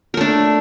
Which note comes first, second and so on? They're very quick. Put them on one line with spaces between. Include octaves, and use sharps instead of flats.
A#4 A3 D4